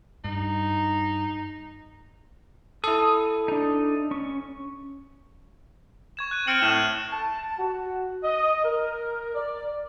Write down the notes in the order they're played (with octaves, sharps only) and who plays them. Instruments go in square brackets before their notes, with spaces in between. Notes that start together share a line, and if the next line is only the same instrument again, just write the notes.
[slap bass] G2 [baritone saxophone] D#4
[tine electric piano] E4 A4 [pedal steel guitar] D#6
[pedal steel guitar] D4 D#4
C#4 C#6
[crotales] C#6 G#6 E7
F#6 D#7
[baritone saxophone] C4 [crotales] F6 C#7 F#7
[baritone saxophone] A2 [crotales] G#6 D#7 E7
[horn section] A5
F#4
D#5
A#4
D5